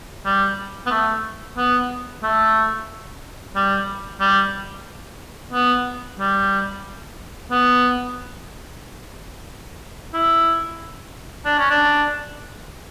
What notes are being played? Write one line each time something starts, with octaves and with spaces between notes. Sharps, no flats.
G3
B3
A3
B3
A3
G3
G3
B3
G3
B3
E4
D4
C#4
D4